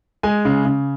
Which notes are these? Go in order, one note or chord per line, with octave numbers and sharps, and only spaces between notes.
G#3 G#5
C#3
C#3